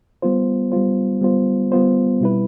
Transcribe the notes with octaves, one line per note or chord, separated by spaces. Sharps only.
G3 B3 F4 C5
G3 B3 F4 C5
G3 B3 F4 C5
G3 B3 F4 C5
B2 G3 C4 E4 B4